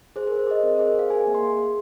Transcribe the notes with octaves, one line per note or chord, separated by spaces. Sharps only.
G#4 C5
A#4
G#4
C5
G#4 D#5
C4 C5
A#4
G#4
C5
G#4 F5
G#4 G#5
A#3
C6
G#4
G#4